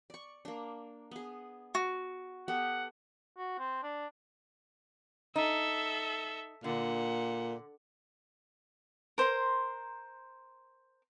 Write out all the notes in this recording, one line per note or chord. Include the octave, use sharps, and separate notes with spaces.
D5 C#6
A#3 D4
B3 G#4
F#4
B3 G4 A4 F#5
F#4
C4
D4
D#4 A4 E5
A#2 D3 F#5
A#4 C5 A#5 C6